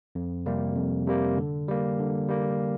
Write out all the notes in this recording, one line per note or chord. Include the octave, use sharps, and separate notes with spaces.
F2
C3 G3 A#3
F2
C3 G3 A#3
D3
G3 A#3
D3
G3 A#3